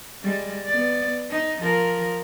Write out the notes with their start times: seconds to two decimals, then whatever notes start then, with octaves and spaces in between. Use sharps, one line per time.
0.23 G3 G#3
0.66 B3 D5
1.30 D#4
1.61 F3 A#4